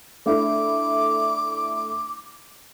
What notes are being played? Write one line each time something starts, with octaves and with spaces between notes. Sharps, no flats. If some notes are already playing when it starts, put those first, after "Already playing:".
A3 D4 E4 D6